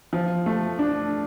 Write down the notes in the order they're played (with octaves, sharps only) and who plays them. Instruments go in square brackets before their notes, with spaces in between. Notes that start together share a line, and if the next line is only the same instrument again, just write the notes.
[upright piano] F3
A3
D4